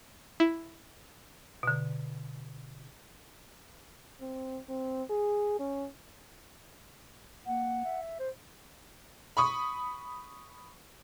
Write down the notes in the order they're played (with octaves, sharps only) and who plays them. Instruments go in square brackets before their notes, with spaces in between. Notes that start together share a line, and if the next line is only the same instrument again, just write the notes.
[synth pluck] E4
[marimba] B2 D3
[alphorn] C4
C4
G#4
C#4
[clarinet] A#3 [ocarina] F#5
[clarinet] E5
C5
[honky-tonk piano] B5 C#6 D#6